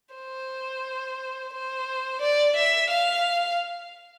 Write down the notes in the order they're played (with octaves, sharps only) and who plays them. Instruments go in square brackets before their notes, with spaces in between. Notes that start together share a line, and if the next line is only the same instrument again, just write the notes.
[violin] C5
C5
D5
E5
F5